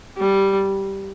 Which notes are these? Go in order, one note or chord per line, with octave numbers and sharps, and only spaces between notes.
G3